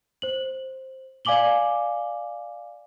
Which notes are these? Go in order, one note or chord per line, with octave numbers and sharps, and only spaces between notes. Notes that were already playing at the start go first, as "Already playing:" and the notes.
C5 F#7
D5 F5 G#5 D6 F#7 G7